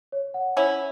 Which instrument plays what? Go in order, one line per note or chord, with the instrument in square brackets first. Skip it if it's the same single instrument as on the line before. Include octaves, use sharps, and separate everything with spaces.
[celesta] C#5
F#5
[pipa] C#4 E4 [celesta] C#5